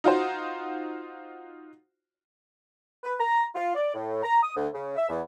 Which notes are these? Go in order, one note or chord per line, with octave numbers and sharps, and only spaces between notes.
D#4 F4 F#4 C5
B4
A#5
F4
D5
A2
A#5
D#6
D2
C#3
E5
E2